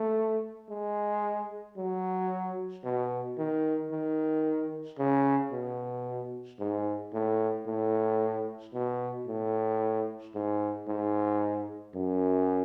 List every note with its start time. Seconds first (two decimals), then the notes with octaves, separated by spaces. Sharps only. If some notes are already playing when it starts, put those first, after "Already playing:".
Already playing: A3
0.70 G#3
1.77 F#3
2.84 B2
3.38 D#3
3.91 D#3
4.99 C#3
5.52 B2
6.59 G#2
7.13 A2
7.67 A2
8.74 B2
9.27 A2
10.34 G#2
10.88 G#2
11.95 F#2